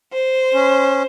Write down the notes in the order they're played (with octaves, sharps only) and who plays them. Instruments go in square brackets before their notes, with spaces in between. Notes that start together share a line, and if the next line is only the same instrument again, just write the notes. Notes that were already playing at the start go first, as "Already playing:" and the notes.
[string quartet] C5
[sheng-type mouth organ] C#4